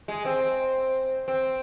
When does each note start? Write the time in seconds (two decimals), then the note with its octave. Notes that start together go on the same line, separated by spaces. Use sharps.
0.08 G#3
0.25 C4
1.28 C4